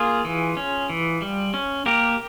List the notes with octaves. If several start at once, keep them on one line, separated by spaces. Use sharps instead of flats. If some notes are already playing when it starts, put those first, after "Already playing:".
Already playing: A#3 F4 G#4
E3
C#4
E3
G3
C#4
A#3 G4 A#4